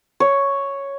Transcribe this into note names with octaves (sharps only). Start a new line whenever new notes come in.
C#5